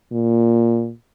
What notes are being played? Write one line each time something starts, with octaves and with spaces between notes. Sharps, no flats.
A#2